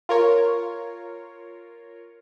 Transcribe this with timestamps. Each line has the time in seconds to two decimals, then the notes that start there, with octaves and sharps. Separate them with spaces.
0.09 F4 A#4 C#5